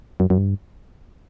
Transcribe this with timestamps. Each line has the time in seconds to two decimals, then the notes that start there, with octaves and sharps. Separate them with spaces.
0.20 F#2
0.30 F#2
0.38 G2